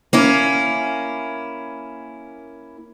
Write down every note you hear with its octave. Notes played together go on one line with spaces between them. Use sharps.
A#3 C#4 E4